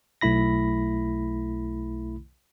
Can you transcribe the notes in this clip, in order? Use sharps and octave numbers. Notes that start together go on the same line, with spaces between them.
B1 A3 E4 B5 A#6